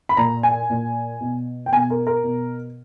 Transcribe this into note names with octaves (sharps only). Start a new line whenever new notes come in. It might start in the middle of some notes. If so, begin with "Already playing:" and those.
B5
A#2 A#5
G#5
A#2
B2
G5
B2 G#5
A#4
A#4
B2